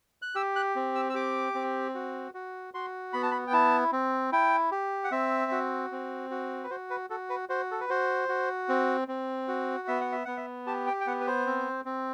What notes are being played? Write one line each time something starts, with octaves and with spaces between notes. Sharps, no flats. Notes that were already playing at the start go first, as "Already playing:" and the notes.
F#6
G4 E6
F#6
C4
E6
E6
G4 D6
C4
F#4
F#4
F#4 C6
B3 B5
A5
B5
G5
E4 A5
C4
E4 G5
G4
F#5
C4 E5
F#4
C4
F#4
B4
F#4 C5
B4
F#4 A4
B4
F#4 C5
A4
B4
F#4 C5
F#4
C4
C4
F#4
B3 E5
F#5
E5
B3 F#5
E5
G4 A5
G5
G5
B3 F#5
B4
C5
C4
C4